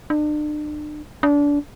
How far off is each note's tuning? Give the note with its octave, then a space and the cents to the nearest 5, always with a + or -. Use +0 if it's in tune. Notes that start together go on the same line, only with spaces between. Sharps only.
D4 +40
D4 -25